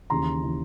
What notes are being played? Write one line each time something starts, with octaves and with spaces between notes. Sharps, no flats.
D#2 C#3 E3 A#5 C6
C#3 E3